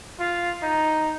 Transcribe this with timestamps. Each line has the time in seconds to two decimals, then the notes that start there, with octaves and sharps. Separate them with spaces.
0.20 F4
0.62 D#4